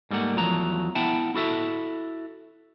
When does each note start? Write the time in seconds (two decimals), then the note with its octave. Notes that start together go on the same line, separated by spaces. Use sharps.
0.11 G#2 G3 A3 A#3 F#5
0.37 E2 F3 F#3 A3 A#5
0.95 B3 E4 E5 F#5 G5 A5
1.35 E4 F#4 A4 E5